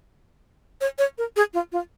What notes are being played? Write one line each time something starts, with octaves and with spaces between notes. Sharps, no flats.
C#5
C#5
A#4
G#4
F4
F4